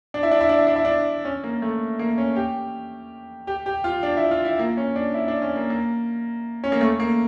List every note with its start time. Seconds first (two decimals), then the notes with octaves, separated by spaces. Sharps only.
0.14 D4
0.23 E4
0.31 D4
0.41 E4
0.49 D4
0.58 E4
0.67 D4
0.76 E4
0.85 D4
1.25 C#4
1.44 A#3
1.62 A3
1.99 A#3
2.18 C#4
2.36 G4
3.47 G4
3.66 G4
3.84 F4
4.03 D4
4.17 E4
4.31 F4
4.45 E4
4.59 A#3
4.77 C#4
4.96 D4
5.14 E4
5.28 D4
5.42 C#4
5.56 A#3
5.70 A#3
6.64 C#4
6.72 A#3
6.81 A3
7.00 A#3